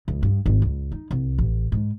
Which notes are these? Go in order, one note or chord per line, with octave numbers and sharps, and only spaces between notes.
C#2
G2
G#1
C#2
D#4
C2
A1
G#2